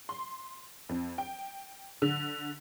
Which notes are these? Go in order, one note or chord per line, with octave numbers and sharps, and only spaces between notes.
C6
F2
G5
D3